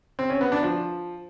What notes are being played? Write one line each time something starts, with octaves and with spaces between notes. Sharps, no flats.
C4
C#4
B3
D4
F3